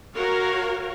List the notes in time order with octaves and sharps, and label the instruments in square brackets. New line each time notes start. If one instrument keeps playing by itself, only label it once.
[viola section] F#4 A#4 C#5 F5